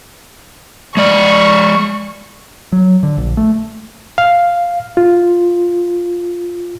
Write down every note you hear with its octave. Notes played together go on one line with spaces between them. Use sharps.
G#3 D5 C#6
F#3
D3
A#1
A3
F5
F4